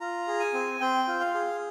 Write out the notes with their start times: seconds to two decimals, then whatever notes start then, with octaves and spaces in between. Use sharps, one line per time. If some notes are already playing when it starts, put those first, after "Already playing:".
0.01 F4 A#5
0.28 G#4
0.40 G#5
0.54 C4
0.81 C4 G5
1.08 F4
1.20 F5
1.34 G#4